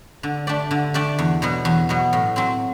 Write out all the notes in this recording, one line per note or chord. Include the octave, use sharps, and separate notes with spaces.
D3
A3 D4 G4 D5
D3
A3 D4 G4 D5
E2
B2 F#3 B3
E2
B2 F#3 B3
A2
F#3 C4